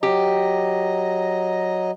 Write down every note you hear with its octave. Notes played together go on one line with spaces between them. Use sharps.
F#3 G4 D#5 A#5